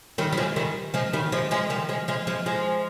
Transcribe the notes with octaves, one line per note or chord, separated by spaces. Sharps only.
D#3 G3
G3
F3 G#3
D#3 G3
F3 G#3
D#3 G3
F3 G#3
F3 G#3
D#3 G3
F3 G#3
F3 G#3
F3 G#3
F3 G#3